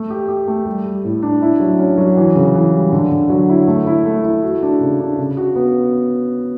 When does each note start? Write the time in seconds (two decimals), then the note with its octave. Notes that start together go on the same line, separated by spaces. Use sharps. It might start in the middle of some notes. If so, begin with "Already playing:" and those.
Already playing: A3
0.10 G4
0.28 G4
0.48 A3
0.66 G3
0.86 G3
1.04 A2
1.23 D4
1.42 E4
1.60 F#3
1.79 C#4
1.98 F#3
2.17 E3
2.35 C#3
2.54 E3
2.73 G3
2.92 D3
3.11 D3
3.30 F#3
3.49 E4
3.68 A3
3.87 E4
4.06 A3
4.25 E4
4.43 F#4
4.62 D4
4.81 C#3
5.00 D4
5.19 C#3
5.37 F#4
5.56 B3